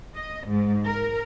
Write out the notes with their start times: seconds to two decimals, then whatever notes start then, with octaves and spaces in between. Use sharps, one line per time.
0.15 D#5
0.47 G#2
0.84 A#4